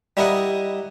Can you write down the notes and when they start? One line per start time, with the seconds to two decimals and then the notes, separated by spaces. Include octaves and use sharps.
0.17 G3 E4 A#4 D#5 F#5